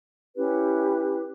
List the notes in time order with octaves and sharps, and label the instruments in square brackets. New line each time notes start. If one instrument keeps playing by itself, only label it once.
[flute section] C#4 E4 G4 B4